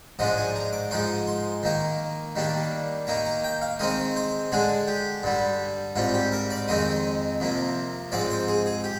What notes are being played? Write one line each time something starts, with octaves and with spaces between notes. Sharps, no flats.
G#2 F3 G#3 D4 D#5
G#5
A#5
D6
G#2 F3 G#3 D#4 C6
C6
D#3 A#3 D#4
D#3 G3 A#3 D4
D#3 A#3 D#4 A#5
A#5
G5
F5
D#3 G#3 C4 D#4 D#5
C5
D3 G#3 D4 G#4
G4
G2 D3 G3
G#2 G3 C4 F4
G4
A#4
D5
F2 D#3 G#3 C4 D#4 D#5
F2 C3 F3 A#3
G#2 F3 G#3 C4 D5
C5
G#4
G#4
G4